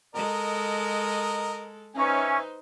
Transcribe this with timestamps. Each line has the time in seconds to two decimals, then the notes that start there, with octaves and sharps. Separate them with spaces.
0.15 G#3 A4 A#4 D#5
1.95 C#4 D#4 B4 C5 E5 G#5